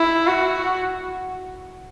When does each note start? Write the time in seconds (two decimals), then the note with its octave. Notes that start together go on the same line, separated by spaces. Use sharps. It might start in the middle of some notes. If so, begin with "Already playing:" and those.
Already playing: E4
0.27 F#4